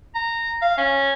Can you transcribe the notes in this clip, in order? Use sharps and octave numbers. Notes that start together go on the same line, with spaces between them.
A#5
F5
C#4